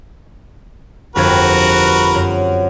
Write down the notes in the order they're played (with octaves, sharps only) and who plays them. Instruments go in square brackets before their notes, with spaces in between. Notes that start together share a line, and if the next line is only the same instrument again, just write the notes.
[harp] G1 F2 G#6 [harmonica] F#4 A#4 B4
[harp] F#2